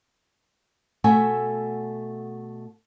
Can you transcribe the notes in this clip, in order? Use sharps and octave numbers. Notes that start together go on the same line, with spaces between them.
B2 A3 F#4 A4 E5 G#5